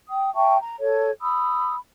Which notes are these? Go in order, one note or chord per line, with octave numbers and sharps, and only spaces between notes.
G5 D#6
E5 G5 A5 C#6
A#5
A4 C#5
B5 D#6 E6